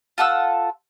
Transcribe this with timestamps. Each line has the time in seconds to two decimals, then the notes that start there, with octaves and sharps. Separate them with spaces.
0.18 F4 A4 F#5 E6